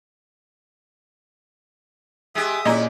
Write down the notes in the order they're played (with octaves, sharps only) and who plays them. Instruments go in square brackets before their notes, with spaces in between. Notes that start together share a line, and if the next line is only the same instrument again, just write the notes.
[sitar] G#3 G4 [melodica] E5 D#6
[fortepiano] A#2 [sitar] C#4 E4 [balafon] D#5 A#5